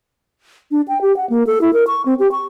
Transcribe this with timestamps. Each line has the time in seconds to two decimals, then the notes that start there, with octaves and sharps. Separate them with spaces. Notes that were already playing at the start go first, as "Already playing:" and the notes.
0.71 D4
0.88 G5
1.02 G4
1.17 F#5
1.30 A#3
1.47 A4
1.61 E4
1.73 A#4
1.87 C#6
2.06 C4
2.19 G4
2.32 C#6